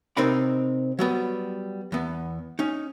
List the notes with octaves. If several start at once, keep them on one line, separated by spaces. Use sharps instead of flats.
C3 C4 D#4 A#4 D5 B5
F#3 G3 B3
E2 B3
C#4 D#4